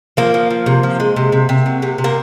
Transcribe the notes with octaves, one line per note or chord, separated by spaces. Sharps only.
F3 A#3
F3
F3
C3
F3
G#3
C3
C3
C3
F#3
C3
C3
A#3